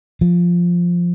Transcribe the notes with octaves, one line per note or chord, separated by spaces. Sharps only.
F3